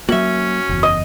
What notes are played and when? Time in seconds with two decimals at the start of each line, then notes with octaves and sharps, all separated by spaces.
0.09 F#3 A#3 C#4 F#4 E5
0.69 F#1 E2
0.83 D#5